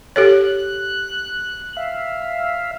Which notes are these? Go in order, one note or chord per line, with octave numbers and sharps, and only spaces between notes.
G4 A4 C#5 F#6
E5 F5